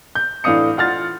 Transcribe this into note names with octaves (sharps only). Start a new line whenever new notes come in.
G6
A2 E3 D4 F5 D#6 C#7
F4 F#5 F6 A6